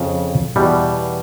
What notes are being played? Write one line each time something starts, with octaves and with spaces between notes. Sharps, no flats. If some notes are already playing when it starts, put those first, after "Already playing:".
Already playing: F2 C#3
E2 B2 G3